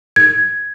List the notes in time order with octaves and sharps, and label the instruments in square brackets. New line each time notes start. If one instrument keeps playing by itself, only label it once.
[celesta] G#6